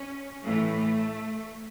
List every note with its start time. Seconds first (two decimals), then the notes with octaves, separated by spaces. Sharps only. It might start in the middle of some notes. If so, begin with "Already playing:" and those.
Already playing: C#4
0.44 A2 E3 A3